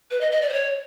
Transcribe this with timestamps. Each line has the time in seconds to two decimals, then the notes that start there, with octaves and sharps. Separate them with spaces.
0.11 B4
0.21 D#5
0.31 D#5
0.42 D5
0.49 C5
0.53 C#5